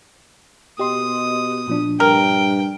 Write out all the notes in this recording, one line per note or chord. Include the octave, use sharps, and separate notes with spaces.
B2 G4 D#5 C6 D#6
A#2 F3 D4
G2 A#4 G5